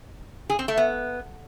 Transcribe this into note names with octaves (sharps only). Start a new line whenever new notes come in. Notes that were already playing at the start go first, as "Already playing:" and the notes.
G#4
C4
A3
B3